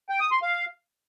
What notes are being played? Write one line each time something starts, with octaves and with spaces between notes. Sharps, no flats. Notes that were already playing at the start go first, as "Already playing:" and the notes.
G5
D#6
C6
F5